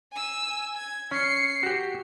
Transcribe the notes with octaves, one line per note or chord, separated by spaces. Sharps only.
G#5 E6
G#6
C#4 C7 C#7
F#4 G4